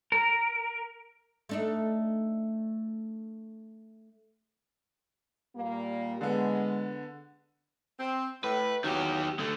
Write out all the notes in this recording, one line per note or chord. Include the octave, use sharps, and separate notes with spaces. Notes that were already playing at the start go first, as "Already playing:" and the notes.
A#4
A3 D4 D#4
A#2 G3 A#3
D3 G#3 B3
C4
A2 B4
E2 D#3 F#3 G4
D3 A3